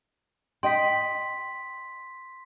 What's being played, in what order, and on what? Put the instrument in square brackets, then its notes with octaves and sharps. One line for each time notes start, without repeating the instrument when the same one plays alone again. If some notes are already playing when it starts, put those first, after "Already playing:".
[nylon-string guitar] D#5 G5 [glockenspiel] C6 B6